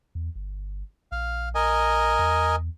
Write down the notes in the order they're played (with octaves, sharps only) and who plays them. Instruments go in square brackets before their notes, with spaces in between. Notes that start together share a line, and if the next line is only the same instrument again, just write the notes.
[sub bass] E2
G1
[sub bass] A#1 [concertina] F5
[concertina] A#4 D#5 G#5
[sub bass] E2